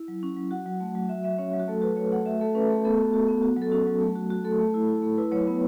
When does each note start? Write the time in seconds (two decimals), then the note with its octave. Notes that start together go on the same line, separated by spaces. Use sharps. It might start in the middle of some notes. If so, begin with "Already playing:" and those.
Already playing: E4
0.08 F#3
0.23 C#4
0.37 F#3
0.51 F#4 F#5
0.66 F#3
0.80 A3
0.95 F#3
1.09 F#4 E5
1.24 F#3 E5
1.38 C#4 C#5
1.53 F#3
1.60 F#4
1.68 A3 A4
1.82 F#4 B4
1.96 F#4 C#5
2.11 A3 F#5
2.26 F#4 E5
2.41 A3 A4
2.55 C#4 B4
2.70 A3
2.85 B3 A4
2.99 F#4
3.13 F#4
3.28 B3
3.43 F#4
3.57 F#3 A4
3.72 C#4 F#4
3.87 F#3
4.00 A3
4.15 F#4
4.30 F#4
4.45 A3 A4
4.59 A3
4.74 E4
4.88 E4
5.02 A3
5.18 E4 B4
5.32 F#3 C#5
5.47 B3